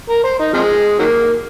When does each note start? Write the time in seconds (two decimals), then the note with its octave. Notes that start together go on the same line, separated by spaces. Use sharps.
0.09 A#4
0.24 C5
0.39 D#4
0.53 C3 F3 G#3
0.99 D#3 F#3 A#3